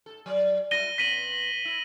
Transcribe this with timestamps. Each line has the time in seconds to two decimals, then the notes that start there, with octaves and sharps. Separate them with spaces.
0.06 G#2 A4
0.26 F#3 D5
0.71 G3 E4 A#6 D#7 G7
0.98 C3 B3 B6 D#7 F#7
1.65 E4